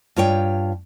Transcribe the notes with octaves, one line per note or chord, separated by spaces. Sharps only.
G2 F4 C#5 G5